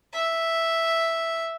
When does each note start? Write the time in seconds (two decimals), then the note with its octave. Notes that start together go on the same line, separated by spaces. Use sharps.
0.13 E5